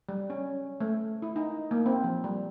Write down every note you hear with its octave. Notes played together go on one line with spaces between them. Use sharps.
G3
C#4
A3
E4
D#4
A#3
C4
F3
G3